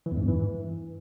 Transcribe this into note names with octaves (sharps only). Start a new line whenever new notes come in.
E3
E2
G#2
G2
E3